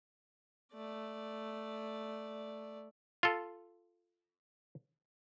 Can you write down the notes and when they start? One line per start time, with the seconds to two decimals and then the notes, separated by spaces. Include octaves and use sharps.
0.73 A3 D5
3.23 F4 A4